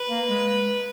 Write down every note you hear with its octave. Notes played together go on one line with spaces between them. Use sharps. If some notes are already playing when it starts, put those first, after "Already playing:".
Already playing: B4
A#3
G#3